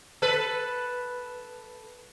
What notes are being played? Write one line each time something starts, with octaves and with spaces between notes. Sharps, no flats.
A4 B4